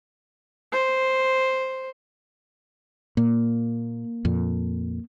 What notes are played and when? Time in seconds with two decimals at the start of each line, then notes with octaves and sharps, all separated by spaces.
0.72 C5
3.17 A#2 A#3
4.25 F2 A#2